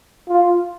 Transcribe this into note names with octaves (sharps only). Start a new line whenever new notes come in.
F4